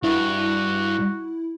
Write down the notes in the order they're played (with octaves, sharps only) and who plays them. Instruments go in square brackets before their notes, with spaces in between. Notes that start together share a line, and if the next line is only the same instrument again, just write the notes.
[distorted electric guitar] G2 [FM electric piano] E4 [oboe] F#4